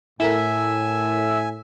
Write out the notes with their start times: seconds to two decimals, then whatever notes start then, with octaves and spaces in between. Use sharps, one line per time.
0.20 A2 E4 A4 A#4 E5 G#5